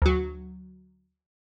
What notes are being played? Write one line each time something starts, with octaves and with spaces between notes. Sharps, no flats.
D2 F#3